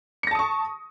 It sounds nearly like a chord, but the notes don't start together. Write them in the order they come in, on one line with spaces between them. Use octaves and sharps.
C#7 A#6 A5 D#6 C#6